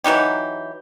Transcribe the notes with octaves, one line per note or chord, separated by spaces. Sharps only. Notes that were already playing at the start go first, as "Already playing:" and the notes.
E3 F#3 D#4 G4